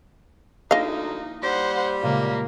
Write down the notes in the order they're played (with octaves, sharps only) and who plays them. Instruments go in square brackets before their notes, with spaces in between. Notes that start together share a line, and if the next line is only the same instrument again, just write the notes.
[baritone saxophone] D2 [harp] A#3 E4 [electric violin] D#4 [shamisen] D#5 F5
[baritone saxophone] G3 [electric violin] C5 F#5
[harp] A#2 C#3 G#3 [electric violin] A#3